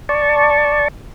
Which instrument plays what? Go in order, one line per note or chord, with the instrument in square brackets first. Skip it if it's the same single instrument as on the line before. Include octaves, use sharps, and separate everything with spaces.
[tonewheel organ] D5 A5 C#6